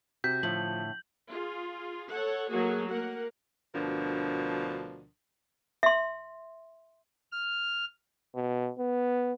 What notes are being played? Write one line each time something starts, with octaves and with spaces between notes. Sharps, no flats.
C3 F#4 G6 B6
A2 D3 F3 F#7
F4 G#4
A4 C#5 F#5
F#3 A3 A#3 F#4 G#4
A#3 A#4 F#5
D2 B2 F3 D4 A#4
E5 C6
F6
B2
B3